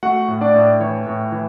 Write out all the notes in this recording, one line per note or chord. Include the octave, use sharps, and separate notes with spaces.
A3 F#4 F#5
A2
D4 D5
A2
E3 C#5
A2
E3